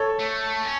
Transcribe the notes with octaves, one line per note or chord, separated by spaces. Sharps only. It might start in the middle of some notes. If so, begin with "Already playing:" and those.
Already playing: A4 C#5
A3
C#4